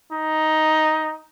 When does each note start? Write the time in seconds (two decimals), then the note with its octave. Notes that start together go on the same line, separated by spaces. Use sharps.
0.13 D#4